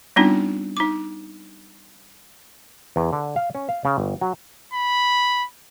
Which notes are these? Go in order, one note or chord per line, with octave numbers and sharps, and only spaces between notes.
G3 B3 C4 D4 D#4 F4
D#4 D6
E2
D3
F5
C#4
F5
C#3
G1
F#3
B5